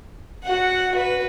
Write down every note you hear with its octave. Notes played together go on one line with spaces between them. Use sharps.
F#4 F#5
F#4 B4